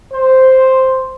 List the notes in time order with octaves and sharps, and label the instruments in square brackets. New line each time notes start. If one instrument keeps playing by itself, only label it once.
[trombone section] C5